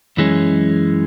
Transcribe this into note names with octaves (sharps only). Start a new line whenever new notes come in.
F#2 E3 G#3 C#4